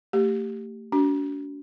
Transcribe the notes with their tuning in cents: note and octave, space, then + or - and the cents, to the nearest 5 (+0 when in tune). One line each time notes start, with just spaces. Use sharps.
A3 +35 G4 +0
D4 -45 F#4 +30